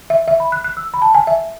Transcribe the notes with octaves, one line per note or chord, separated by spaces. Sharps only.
E5
E5
B5
F#6
F#6
E6
B5
A5
G#5
E5